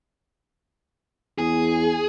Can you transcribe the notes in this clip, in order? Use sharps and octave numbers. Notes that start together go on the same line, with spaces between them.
E2 G#4